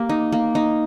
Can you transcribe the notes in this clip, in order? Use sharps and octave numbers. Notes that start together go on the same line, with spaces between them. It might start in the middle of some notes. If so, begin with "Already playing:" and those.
Already playing: A#3 G4
D#4
A#3
D#4